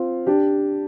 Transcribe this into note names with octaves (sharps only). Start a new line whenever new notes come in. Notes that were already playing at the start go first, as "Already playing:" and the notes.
Already playing: C4 F4
D4 G4